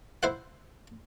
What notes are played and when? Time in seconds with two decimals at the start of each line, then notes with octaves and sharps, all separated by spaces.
0.23 E4 C5 F#5